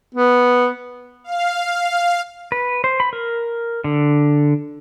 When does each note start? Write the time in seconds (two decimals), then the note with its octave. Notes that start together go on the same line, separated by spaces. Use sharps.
0.15 B3
1.24 F5
2.52 B4
2.84 C5
3.00 B5
3.13 A#4
3.84 D3